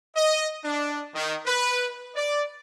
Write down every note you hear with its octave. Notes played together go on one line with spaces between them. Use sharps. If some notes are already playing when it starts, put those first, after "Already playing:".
D#5
D4
D#3
B4
D5